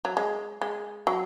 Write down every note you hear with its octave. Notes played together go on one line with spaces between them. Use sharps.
F#3
G#3
G#3
F#3